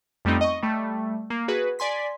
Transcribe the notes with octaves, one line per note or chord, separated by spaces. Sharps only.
F2 G3 A3 B3 C4 D#4
D#5 C#6
G3 A3
A#3
F#4 G#4 B4
D5 G#5 C6 B6